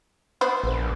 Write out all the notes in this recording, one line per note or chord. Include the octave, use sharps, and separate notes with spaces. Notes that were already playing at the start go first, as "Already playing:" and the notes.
B3 B4 C5
A#1